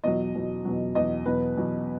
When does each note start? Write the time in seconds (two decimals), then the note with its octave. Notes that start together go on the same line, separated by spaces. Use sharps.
0.04 E2 B2 F#3 D#5
0.35 E2 B2 F#3
0.65 E2 B2 F#3
0.95 E2 B2 F#3 D#5
1.26 E2 B2 F#3 B4
1.57 E2 B2 F#3